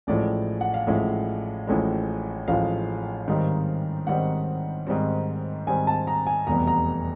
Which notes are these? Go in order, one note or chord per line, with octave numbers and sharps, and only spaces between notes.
A1 A2 F3 G#3 D5
F#5
F5
A1 A2 F3 G#3 E5
A1 A2 F3 G#3
A1 A2 F3 G#3 F5
G#2 D#3 G3 C4
G#2 D#3 G3 C4 F#5
G#2 D#3 G3 C4
G#2 D#3 G3 C4 G#5
A5
A#5
G#5
F1 E2 B2 G3 B3 A#5
A#5